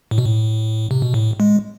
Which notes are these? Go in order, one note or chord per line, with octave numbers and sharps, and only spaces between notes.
A2
B2
A2
C3
B2
A2
G#3